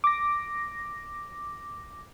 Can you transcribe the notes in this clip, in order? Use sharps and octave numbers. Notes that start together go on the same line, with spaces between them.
D6 A#6